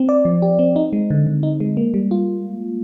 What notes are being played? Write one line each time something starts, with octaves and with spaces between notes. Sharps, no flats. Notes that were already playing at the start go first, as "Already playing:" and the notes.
Already playing: C4
D5
F3
G4
C4
D#4
G#3
D3
D3
D#4
G#3
A#3
G3
F4